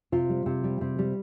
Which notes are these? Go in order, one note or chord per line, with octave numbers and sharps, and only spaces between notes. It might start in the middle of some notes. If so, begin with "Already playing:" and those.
C3 F4
G3
C3
G3
C3
G3